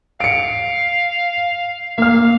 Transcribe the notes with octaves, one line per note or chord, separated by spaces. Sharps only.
F5 C#7 D7
A#3 F5 F6